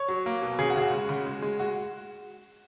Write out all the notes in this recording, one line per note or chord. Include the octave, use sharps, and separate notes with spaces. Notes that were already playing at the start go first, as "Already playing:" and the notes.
Already playing: C#5
F#3
A#3
B2
C#3 G#4
F#4
C#3 G#4
F#4
G#3
C#3
G#3
G#3
G#3 F#4